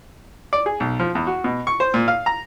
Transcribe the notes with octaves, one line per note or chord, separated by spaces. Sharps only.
D5
G#4
B1
F3
E2
F#4
B2
C#6
C5
A#2
F5
A#5